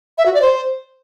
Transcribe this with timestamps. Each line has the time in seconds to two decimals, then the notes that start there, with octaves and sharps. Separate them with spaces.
0.18 E5
0.26 F#4
0.34 D5
0.42 C5